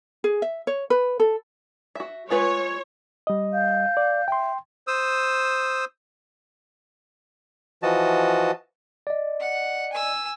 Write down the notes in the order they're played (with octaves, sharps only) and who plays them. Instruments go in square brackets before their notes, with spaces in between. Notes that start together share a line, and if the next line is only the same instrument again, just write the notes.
[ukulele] G#4
E5
C#5
B4
A4
[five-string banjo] F#4 E5
[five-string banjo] G#3 F4 B4 [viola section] C#5
[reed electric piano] G3 D#5
[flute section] F5 G6
[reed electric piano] D5
[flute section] E5 [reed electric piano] G5 C6
[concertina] C5 D#6 E6
[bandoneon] E3 F3 F#4 D#5 A5
[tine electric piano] D5 D#5
[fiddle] F#5
G#5 E6